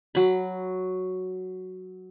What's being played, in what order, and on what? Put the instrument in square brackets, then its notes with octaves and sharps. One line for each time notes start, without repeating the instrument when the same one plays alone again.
[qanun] F#3 B5